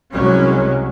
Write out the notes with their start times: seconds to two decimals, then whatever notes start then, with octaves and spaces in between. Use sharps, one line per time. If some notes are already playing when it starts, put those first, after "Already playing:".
0.13 C2 F#3 G#3 C#4